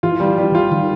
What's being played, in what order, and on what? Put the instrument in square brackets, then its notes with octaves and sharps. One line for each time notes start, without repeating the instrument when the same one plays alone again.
[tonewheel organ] E3 [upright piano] F4
[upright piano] G3
G3
F4
[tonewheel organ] D#3